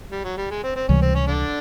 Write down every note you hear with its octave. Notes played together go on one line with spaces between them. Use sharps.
G3
F#3
G3
G#3
C4
C4
C#2 C3 E3 G3 C#4
C4
C#4
D3 D4